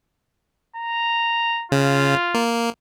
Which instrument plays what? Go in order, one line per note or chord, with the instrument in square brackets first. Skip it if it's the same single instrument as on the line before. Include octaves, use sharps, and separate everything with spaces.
[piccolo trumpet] A#5
[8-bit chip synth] C#3 [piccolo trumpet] F4
[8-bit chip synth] A#3